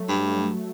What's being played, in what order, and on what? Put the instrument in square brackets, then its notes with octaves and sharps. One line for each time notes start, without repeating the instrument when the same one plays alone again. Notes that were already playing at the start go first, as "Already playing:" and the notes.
Already playing: [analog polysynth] F#3 A3
[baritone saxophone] G2